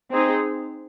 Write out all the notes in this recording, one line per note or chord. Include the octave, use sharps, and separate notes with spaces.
C4 D#4 G#4